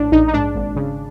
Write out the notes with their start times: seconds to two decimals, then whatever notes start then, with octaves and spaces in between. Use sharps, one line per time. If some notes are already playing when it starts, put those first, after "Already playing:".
Already playing: A#1 A2 D4
0.12 A#1 D#4
0.28 D#4
0.34 G#2 D4
0.55 G#1
0.76 C#3